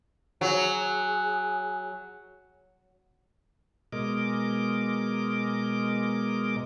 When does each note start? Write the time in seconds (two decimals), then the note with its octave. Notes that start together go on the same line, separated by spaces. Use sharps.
0.41 F#3 G#4
3.93 B2 G#3 A#4 D#5 D6